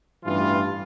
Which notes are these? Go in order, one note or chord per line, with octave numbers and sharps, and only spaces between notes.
A1 G2 E3 F4